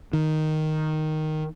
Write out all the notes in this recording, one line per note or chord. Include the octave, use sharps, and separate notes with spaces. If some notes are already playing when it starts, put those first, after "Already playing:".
D#3